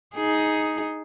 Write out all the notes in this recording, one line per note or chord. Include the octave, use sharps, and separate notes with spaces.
D#4 G#4